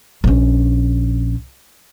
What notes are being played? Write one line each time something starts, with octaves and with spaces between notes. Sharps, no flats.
A#1 C#4